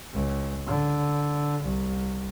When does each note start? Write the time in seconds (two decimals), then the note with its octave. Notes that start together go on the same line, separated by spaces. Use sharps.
0.14 C#2
0.67 D3
1.63 C2